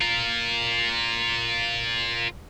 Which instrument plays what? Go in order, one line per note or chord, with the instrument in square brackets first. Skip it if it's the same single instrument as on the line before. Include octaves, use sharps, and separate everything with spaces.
[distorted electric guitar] F4 A#4